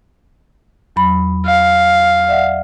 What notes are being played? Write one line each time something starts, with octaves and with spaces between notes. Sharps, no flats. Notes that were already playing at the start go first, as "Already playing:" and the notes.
E2 F#3 B5
F5
D5 E5 F#5